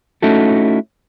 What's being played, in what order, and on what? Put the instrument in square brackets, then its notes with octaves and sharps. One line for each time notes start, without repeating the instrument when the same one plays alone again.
[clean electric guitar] A3 C#4 D#4 E4 F#4 A4